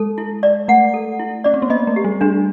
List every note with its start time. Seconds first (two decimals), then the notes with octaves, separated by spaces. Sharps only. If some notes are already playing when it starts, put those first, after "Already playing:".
Already playing: G#3 A4
0.18 E4
0.43 D5
0.68 A3 F#5
0.94 A4
1.19 E4
1.44 C#4 D5
1.54 C4
1.62 B3
1.70 A#3 D#5
1.87 A3
1.96 G4
2.05 G3
2.21 G3 D4